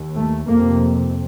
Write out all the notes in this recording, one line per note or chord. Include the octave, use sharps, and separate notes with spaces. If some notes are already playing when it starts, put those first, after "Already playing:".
Already playing: D#2
A3
F2 C3 A#3